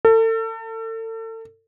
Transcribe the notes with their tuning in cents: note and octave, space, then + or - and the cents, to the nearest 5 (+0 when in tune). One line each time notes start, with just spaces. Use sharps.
A4 +35